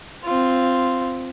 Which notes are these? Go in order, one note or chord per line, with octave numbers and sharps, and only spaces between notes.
C4 F4